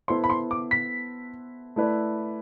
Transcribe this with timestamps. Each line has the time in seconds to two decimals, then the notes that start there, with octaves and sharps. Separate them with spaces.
0.08 B3 E4 A4 C5 C6
0.24 B5
0.30 C6
0.51 D6
0.71 B6
1.76 A3 E4 B4 D5